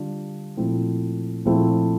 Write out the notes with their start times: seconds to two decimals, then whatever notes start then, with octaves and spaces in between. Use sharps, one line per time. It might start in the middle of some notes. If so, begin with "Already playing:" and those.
Already playing: D3 G3 D4 F4
0.57 A#2 F3 A3 C4 E4
1.45 A#2 F3 A3 C4 E4